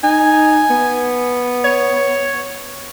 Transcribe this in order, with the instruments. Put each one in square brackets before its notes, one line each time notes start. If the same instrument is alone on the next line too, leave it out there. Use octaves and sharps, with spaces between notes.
[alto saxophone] D#4 [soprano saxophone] G#5
[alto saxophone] B3
[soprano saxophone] C#5